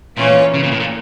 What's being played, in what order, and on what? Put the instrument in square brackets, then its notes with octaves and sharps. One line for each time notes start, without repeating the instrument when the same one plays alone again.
[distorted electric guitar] A#2 [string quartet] E3 A#3 C#4 F4 C#5
[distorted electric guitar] C#3
A#2
A2
A#2